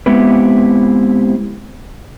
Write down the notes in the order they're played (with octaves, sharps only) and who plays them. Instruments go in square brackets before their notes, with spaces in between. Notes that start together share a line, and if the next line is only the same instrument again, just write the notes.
[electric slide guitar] G#3 B3 C4 E4 G4 B4